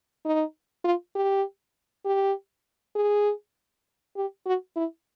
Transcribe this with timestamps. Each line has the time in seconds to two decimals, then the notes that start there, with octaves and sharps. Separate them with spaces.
0.25 D#4
0.85 F4
1.15 G4
2.05 G4
2.95 G#4
4.17 G4
4.46 F#4
4.76 E4